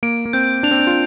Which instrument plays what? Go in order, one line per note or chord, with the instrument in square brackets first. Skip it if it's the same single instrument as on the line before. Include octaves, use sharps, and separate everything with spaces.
[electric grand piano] A#3 [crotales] D7
[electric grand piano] A#3
[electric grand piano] C4 [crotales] G6
[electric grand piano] D4 [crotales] F7
[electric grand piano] C4
D4
F4